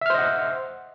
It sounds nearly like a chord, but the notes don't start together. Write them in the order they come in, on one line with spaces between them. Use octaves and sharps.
E5 F6 C5 D#5 F#5